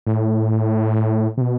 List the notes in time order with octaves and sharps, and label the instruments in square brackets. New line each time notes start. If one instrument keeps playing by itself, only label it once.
[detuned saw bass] A2
C3
B2